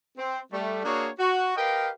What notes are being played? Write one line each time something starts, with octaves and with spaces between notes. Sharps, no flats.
C4
G3 A3
A#3 D4 F#4 G#4 C#5
F#4
G4 A#4 B4 D#5 F5 G5